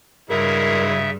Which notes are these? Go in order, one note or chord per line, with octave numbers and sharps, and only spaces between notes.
G2 C#3 F#3 G#3 E4 A#4 E5